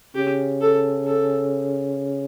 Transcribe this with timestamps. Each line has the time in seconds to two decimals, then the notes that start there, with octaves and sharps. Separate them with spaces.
0.15 C#3 G4
0.61 A4
1.07 A4